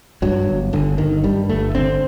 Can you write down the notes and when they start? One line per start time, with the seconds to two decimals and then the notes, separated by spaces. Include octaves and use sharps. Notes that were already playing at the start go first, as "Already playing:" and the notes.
0.22 G2 F#3
0.48 G1
0.73 G1 D3
0.98 G1 D#3
1.24 G2 G3
1.49 G1 A3
1.75 D3 C4